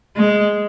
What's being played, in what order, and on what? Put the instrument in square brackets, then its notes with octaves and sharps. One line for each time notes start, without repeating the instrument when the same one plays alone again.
[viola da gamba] G#3